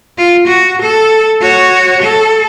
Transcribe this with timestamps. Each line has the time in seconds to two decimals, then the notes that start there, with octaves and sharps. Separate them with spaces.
0.18 F4
0.47 F#4
0.82 A4
1.41 F#4 C#5
2.02 A4